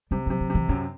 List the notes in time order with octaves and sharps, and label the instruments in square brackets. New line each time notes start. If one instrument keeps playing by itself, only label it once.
[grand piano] C3 [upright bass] G3
[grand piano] C3 [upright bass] F#3
[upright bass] F#3
[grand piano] C3 [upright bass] E3
[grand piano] F#2 [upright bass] C4